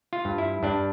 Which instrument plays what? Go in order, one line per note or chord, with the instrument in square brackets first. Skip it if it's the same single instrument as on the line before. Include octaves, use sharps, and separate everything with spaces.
[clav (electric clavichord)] F4
G2
E4
G2 D4